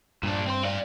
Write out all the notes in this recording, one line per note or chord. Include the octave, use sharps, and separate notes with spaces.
G2 A#2 D4
C4 C5
D5 F5